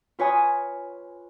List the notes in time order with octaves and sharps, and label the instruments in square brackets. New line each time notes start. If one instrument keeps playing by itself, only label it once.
[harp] F4 B4 C#5 G#5 D#6